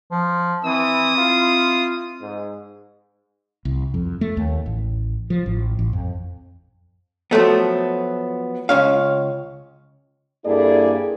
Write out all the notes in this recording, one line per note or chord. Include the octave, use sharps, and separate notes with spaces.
F3
E3 C4 E4 D#6
F4
G#2
C2
F2
A3
D#2
A1
F3
A1
A1
F2
F3 F#3 A3 B3
C#2 C#4 F5
G2 A#3 E4 G#4 A4 D5